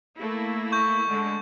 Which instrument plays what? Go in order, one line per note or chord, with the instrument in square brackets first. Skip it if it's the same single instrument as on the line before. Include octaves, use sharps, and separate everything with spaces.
[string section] A3 A#3 E4
[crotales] C#6 G6
[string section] D3 G#3 A3